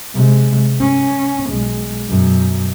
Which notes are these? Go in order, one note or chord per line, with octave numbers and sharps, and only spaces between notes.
C3 G#3
C#4
B1 G#3
F#2 B2